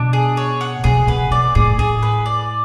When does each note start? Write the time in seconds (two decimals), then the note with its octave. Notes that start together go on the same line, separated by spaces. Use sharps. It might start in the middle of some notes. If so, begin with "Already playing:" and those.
Already playing: B2 D4
0.13 G#4
0.37 C#5
0.61 F#5
0.84 B2 G#4
1.07 B2 B4
1.31 B2 D5
1.55 A2 G#4
1.78 A2 G#4
2.03 B4
2.26 D5